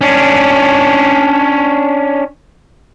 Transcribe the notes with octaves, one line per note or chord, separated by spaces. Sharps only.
C#4 D4